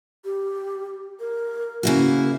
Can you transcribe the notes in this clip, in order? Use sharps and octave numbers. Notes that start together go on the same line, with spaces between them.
G4
A#4
C#3 A#3 E4 F#4